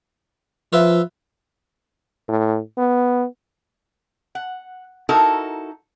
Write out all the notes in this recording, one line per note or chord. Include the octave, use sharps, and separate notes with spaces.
F3 F4 B4 E5
A2
B3
F#5
D#4 E4 F#4 A4 A#4